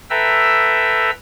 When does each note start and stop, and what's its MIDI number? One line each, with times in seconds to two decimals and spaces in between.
0.10 1.11 69
0.10 1.11 71
0.10 1.11 76
0.10 1.11 79
0.10 1.11 82
0.10 1.11 88